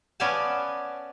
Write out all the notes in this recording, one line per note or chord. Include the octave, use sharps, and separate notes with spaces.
B3 C#4 D5 F5 G#5 A5